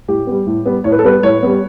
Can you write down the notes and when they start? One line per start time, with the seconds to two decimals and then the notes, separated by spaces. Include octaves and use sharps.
0.08 A2 G4
0.27 G3 B3
0.47 A2
0.66 G3 B3
0.84 A2 C#5
0.92 B4
0.99 A4
1.03 G3 B3 B4
1.23 A2 C#5
1.43 G3 B3